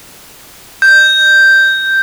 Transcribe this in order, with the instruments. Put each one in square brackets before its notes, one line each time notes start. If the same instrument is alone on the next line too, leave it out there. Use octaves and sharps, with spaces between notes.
[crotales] G6